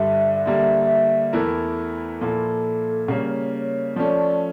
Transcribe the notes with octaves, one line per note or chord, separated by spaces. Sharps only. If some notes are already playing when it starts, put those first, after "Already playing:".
Already playing: G2 D3 G3 E5
D3 G3 A#3
E2 E3 A3 E4 A#4
A#2 F3 A#3 E4 A4
C#3 G3 A#3 C#5
F3 A3 C#4 D5